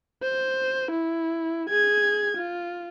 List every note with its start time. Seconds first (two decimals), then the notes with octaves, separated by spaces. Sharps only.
0.23 C5
0.91 E4
1.70 G#4 G#6
2.37 F4